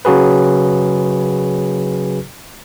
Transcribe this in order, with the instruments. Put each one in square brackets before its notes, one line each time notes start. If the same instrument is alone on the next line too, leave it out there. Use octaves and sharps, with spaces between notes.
[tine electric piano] C#3 F#3 F#4 G#4 B4